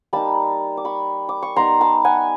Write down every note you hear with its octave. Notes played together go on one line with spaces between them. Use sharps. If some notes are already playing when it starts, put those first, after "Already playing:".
G3 A#3 D#4 A5 B5
D6
B5 C#6
D6
C#6
G3 B3 D#4 A#5 C6
A5 B5
F#5 G#5